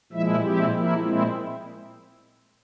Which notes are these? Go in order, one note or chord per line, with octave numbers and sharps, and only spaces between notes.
A#2 F3 G#3 E4 E5
A#2 F3 G#3 C4 E4 G4
F3 A#3 E4
A#2 G#3 C4 E4 F4